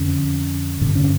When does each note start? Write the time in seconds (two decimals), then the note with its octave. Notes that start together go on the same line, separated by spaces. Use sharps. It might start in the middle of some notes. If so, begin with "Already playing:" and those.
Already playing: F2 D3 C#4
0.81 G2 D3
0.95 C#4